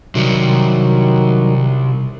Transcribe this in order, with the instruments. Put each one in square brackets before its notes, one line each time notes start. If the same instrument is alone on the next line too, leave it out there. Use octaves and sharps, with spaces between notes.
[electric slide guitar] C3 G3 [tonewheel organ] D#3 F#3